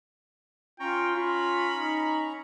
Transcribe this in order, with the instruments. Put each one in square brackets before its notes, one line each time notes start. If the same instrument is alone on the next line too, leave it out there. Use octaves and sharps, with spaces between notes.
[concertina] C#4 A#5 C#6 [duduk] F4 [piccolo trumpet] G5
[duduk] F4 [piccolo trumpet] B5
[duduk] D#4